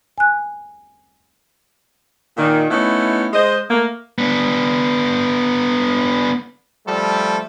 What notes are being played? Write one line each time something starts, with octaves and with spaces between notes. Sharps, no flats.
G#5 F#6
A#2 D#3
A3 B3 C#4 D#4 E4
G#3 C5 D#5
A3 A#3
B3 D4
F3 G3 A3 A4